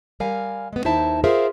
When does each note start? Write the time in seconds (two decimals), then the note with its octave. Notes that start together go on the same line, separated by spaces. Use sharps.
0.20 G3 A#4 F5 G#5
0.73 G#3 B3
0.85 D#2 D#4 E4 C5 E5 A5
1.24 F4 G#4 A#4 C5 E5 F5